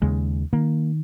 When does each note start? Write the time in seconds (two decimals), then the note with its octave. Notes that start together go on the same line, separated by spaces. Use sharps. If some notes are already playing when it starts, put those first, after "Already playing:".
0.02 D#2 C#3 G#3
0.53 D#3 A#3